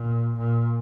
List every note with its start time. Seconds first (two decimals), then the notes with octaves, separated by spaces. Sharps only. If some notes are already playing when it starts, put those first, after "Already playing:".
Already playing: A#2
0.37 A#2